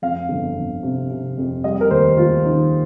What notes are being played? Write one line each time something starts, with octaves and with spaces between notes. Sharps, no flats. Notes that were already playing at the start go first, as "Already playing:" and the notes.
F2 F5
G1
G1
C3
C3
F2
G3 D#5
A#4
D#2 C5
D#2 F4
D#3 D#4